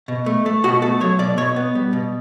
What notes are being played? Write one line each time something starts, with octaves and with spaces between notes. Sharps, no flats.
B2
A3
A3
B2 F#4
A3 A4
F#3 C#5
B2 D5
B2 C#5
B3
G3
B2